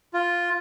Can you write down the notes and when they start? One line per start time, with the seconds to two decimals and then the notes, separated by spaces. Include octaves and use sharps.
0.14 F4